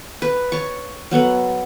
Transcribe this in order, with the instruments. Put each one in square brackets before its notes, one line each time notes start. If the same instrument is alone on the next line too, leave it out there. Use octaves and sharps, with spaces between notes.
[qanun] B4
C#5 A5 C#6
F#3 B3 A4 F#5